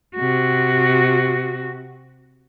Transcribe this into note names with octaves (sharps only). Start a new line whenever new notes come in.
C3 F#4